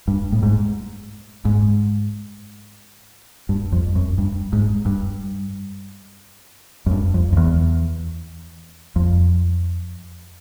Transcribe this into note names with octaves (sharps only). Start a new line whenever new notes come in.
G2
A2
G#2
G#2
G2
F2
F#2
G2
G#2
G2
F#2
G2
F2
F2
E2
F2